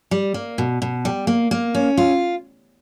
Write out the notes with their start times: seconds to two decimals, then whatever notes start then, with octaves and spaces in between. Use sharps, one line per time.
0.11 G3
0.34 A#3
0.58 B2
0.82 B2
1.05 G3
1.27 A#3
1.51 A#3
1.74 C#4
1.97 F4